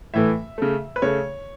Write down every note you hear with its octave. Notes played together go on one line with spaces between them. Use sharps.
A2 E3 A3 E5
C#3 A3
B4
C#3 A3 C#5